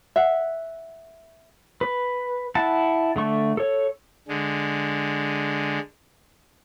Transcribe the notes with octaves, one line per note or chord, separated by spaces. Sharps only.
E5 F#5
B4
E4 F#5 A5
D3 A3 C#6
A4 C#5
D3 G#3